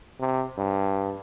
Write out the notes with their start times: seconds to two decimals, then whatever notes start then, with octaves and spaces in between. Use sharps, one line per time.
0.20 C3
0.58 G2